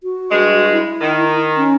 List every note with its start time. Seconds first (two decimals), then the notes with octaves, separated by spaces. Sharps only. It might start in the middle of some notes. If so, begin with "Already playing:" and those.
0.03 F#4
0.31 G2 G#3
0.72 E4
1.01 D#3
1.57 C#4